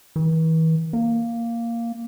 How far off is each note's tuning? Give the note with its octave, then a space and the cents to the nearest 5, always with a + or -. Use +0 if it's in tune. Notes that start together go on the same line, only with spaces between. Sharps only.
E3 -40
A#3 -5